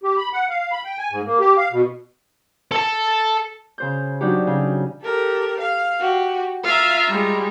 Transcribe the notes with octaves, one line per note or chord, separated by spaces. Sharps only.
G4
B5
F#5
F5
B5
G5
G#5
G#2
A#3
G4
F5
B2
A4 A5
C#3 C5 G6
F#3 D4 D#4 G4
C#3
G4 A4 A#4
F5
F#4 G4
F4 E5 F5 A#5
G3 G#3